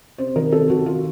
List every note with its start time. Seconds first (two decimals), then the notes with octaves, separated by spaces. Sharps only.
0.18 C3 C5
0.36 D#3 A#4
0.52 C3 A4
0.70 D#3 F#4
0.86 C3 F4